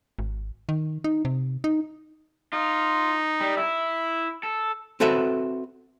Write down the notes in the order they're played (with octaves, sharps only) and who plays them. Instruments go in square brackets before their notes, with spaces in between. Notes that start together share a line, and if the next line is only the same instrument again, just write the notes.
[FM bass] G#1
D#3
D#4
C3
D#4
[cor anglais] D#4 [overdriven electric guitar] F4
[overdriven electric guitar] G3
[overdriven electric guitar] E4 [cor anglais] E5
[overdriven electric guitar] A4
[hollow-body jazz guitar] C4 F#4 A4 B4 E5